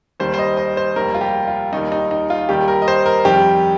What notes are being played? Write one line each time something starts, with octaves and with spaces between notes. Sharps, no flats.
D#2 D#3 G3 C5
C5
D#5
D#5
C5
F1 D#2 D#3 G3 A#4
F4
G4
F4
D#2 D#3 G3 D#4
D#4
D#4
F4
D#2 D#3 G3 G4
A#4
D#5
C5
A#4
F2 D#3 G3 G4